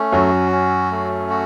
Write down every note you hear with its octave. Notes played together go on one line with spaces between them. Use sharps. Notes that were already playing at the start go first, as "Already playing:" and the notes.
Already playing: A3 C#4
F#2 F#3 F#4
C#4
A3
F#4